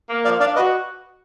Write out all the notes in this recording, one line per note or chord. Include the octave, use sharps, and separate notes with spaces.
A#3
F3 D5 F5
D4 D5 F5
F#4 B4 D#5